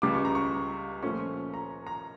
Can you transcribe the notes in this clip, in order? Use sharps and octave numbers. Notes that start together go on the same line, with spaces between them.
C#2 C#3 G3 D6
C#6
A#5
C#6
A#2 F3 A3 C#4 C#6
A#5
A#5